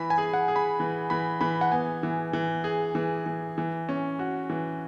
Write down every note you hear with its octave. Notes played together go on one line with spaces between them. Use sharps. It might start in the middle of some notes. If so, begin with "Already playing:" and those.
Already playing: E3 B5
G#5
G#4
F#5
G#4
B5
E3
E3 B5
E3 B5
F#5
B3 G#5
E3
E3
G#4
E3
E3
E3
C#4
F#4
E3